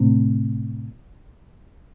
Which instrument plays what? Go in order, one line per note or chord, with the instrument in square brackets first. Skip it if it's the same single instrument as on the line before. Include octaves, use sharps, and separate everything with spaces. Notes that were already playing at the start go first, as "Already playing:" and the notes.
Already playing: [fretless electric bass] A2 C3